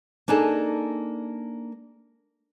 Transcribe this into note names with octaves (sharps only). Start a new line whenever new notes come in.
A#3 D4 D#4 G#4 A4